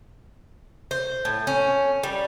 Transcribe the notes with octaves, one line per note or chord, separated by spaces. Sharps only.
C5
A2
C#4
G3